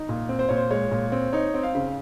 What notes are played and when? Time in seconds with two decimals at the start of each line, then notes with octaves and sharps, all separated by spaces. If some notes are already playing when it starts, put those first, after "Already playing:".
Already playing: D#4
0.09 A#2
0.29 C4
0.39 C5
0.49 A#2 C#5
0.56 C5
0.71 G#3 C#5
0.91 A#2
1.12 C4
1.33 D#4 C#5
1.54 C4
1.63 F5
1.75 C#3